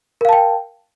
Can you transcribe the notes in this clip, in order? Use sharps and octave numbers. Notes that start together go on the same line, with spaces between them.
A#4 F5 G5 A5